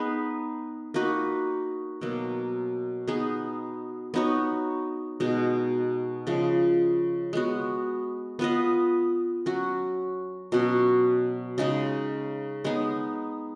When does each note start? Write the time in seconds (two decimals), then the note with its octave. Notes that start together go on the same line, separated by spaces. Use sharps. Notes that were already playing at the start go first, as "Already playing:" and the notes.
Already playing: B3 D#4 G#4 B4
0.94 A#3 D#4 F#4 B4
2.01 B2 F#3 A#3
3.08 B3 D#4 G#4
4.14 B3 D#4 F#4 C#5
5.20 B2 G#3 D#4
6.27 C#3 F3 G#3
7.33 G#3 B3 F#4
8.39 B3 F4 B4 D#5
9.46 F#3 C#4 F#4
10.52 B2 F#3 C#4 F#4
11.58 C#3 G#3 D#4 G#4
12.64 G#3 B3 D#4 G#4